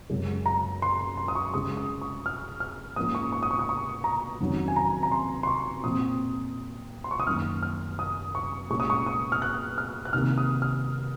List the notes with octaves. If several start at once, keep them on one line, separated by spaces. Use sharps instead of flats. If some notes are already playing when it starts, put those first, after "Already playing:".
F#2 C#3 G#3
A#5
C6
C6
D#6
C#6
C#3 G#3 C#4 D#6
D#6
C#6
F6
F6
G#2 F3 A#3 C#4 D#6
C#6
C#6
D#6
C#6
D#6
C#6
A#5
F2 D#3 F#3 C#4
G#5
A#5
A#5
C6
C6
C#6
A#2 F3 C4 D#6
C6
C#6
D#6
F#2 D#3 A#3 F6
F6
D#6
C#6
A#2 G#3 C#4 C#6
D#6
C#6
D#6
F6
F#6
F6
F#6
C3 D#3 A#3 F6
D#6
F6